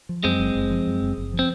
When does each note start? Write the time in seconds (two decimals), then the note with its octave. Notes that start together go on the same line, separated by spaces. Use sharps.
0.09 F3
0.24 F#2 G#3 C4
0.39 F#1
0.55 F#1
0.71 F3
0.87 F#2
1.02 F#1
1.18 F#1
1.34 F3
1.39 C4